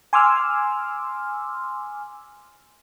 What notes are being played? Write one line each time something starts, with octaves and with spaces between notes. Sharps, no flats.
G#5 C6 D6 E6 F6